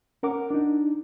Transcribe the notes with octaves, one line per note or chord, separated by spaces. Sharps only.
C#4 A#4 F#5 D6
D4 D#4